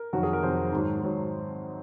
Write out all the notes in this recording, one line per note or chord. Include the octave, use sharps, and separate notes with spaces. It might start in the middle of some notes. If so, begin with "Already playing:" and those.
Already playing: A#4
F2 C3 D#3 F#3 F#4
G#4
A#4
F2 C3 D#3 F#3 C5
G#2 D#3 F#3
G#2 D#3 F#3